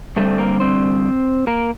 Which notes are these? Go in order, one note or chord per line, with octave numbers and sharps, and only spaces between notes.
G2 D3 G3 A3 C4 A4
A#3 A#4
C4 C5
A#3 A#4